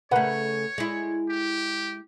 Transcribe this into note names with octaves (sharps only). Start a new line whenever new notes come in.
C#3 A3 A#4 B4 C#5 F#5
G#3 E4
G4